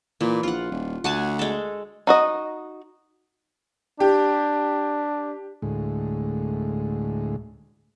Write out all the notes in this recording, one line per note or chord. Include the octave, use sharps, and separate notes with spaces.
A#2 E3
A#1 F4 F#5
D#1
D2 F#5 G#5 A5
G#3 A4
D#4 F#4 D#5
D4 G4
D2 A2 G#3